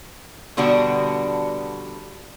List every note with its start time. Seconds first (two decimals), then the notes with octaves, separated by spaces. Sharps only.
0.57 B2 D3 G3 B3 D4 F#4